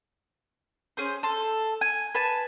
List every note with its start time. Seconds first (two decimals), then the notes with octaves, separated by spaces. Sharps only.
0.97 C#4 G#4 C5
1.23 A4 C6
1.81 G#5
2.15 B4 G#5 A5